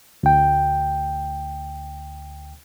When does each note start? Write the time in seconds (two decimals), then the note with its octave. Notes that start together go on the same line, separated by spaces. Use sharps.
0.23 D2 G5